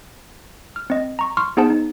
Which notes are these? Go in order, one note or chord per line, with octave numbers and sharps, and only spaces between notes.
F6
C4 D#5
A#5 C#6
C6 C#6 F6
B3 D#4 G#4 C5 F#5 A5
D#4